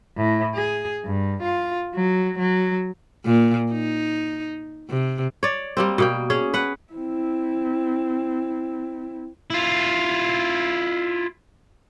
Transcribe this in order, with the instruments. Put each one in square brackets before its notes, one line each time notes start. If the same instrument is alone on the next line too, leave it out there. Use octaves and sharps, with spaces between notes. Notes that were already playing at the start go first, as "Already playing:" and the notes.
[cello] A2
G#4
G2
F4
F#3
F#3
[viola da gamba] A#2
D#4
C3
[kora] C#5 D5
G3 A#3 C4
B2 A#3 G5
C#4 G#4
B4 F#5
[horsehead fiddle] C4 E4
[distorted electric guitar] E4 F4